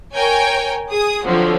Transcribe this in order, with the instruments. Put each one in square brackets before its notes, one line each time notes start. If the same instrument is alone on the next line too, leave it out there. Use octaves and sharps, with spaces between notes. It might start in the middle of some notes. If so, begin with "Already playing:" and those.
[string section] A#4 C#5 G5 G#5
G#4 D#6
D3 F3 F#3 C4